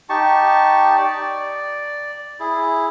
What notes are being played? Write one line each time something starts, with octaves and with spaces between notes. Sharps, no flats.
D#4 G4 A5 C#6
D5
E4 G#4